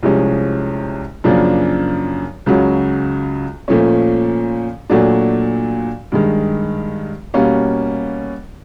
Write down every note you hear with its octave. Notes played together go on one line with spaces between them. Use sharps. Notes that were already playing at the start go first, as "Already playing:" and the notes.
C2 C3 F3 G#3 C#4
F#2 C#3 F3 A#3 D4
C#2 C#3 F#3
A#2 F3 A3 C#4
A#2 F#3 A3 D4
G2 D#3 G#3
B2 G3 A#3 C#4